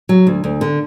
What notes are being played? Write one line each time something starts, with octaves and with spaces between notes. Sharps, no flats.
F#3
D2
D2
D3